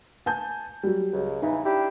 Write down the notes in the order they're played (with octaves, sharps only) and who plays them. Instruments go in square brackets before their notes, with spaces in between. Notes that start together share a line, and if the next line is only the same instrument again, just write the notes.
[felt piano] G#5 A5 G6
F#3 G3
[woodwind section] C#2
[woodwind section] E2 C#3 E3 [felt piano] D#4
[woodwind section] D4 E4 G4